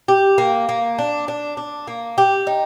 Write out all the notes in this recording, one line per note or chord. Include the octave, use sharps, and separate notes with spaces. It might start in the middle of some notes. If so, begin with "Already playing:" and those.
G4
A#3
A#3
D4
D4
D4
A#3
G4
D#4